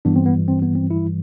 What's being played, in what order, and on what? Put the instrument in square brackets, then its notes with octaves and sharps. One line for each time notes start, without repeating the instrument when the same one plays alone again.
[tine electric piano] G2 E3 G3 B3 D4
C4
B3
C4
B3
C4
E4